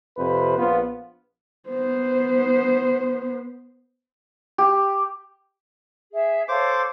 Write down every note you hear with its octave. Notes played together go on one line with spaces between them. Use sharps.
F2 C3 B4 C5
A#1 B3 F4
B3 C5
G4
G#4 E5
A4 C5 C#5 F5 D6